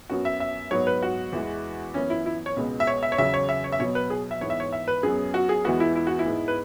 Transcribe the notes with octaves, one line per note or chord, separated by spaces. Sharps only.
F#2 F#3 B3 F#4
E5
E5
G#2 F#3 B3 C#5
B4
F#4
E2 E3 G#3
F#2 E3 B3 C#4
E4
E4
C#5
C#2 B2 G#3 B3
E5
C#5
E5
C#5
E2 C#3 F#3 E5
C#5
E5
C#5
E5
B2 F#3 B3 C#5
B4
G#4
E5
G#2 E3 B3 C#5
E5
C#5
E5
B4
F#2 F#3 B3 G#4
F#4
G#4
E2 E3 G#3 B3 F#4
E4
E4
F#4
E4
G#2 G#3 B3
B4